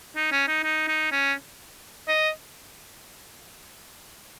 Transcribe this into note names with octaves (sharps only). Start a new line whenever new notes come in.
D#4
C#4
D#4
D#4
D#4
C#4
D#5